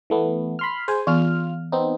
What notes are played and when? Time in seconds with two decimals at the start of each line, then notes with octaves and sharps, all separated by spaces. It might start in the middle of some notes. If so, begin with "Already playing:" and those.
0.10 E3 A3 B3
0.59 B5 C6 F6
0.88 G#4 C5 G#5
1.07 E3 B3 F4 F6
1.72 B3 C4 D#4